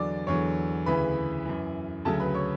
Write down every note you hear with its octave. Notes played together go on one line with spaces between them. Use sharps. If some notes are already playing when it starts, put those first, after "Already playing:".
Already playing: E2 D3 F#3 D5 D6
E2 D3 F#3 C#5 C#6
D2 C#3 E3 B4 B5
F#2 E3
D2 C#3 F#3 A4 A5
B4 B5
C#5 C#6